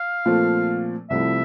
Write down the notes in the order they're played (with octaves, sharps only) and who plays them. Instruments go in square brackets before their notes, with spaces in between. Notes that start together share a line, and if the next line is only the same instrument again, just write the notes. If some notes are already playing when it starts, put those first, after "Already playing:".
Already playing: [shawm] F5
[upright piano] A#2 F3 A3 C4
[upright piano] C2 C3 F3 A3 E4 [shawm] E5